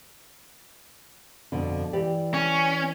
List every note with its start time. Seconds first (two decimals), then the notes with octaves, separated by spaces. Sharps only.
1.52 F2 B2 D3
1.93 E3 G4 D5
2.34 C#4